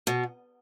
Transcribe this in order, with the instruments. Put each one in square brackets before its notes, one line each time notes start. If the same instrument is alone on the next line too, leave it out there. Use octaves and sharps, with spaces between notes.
[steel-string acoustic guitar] B2